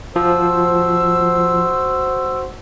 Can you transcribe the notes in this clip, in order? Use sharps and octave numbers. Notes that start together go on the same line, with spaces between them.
F3 F#4 C5 E6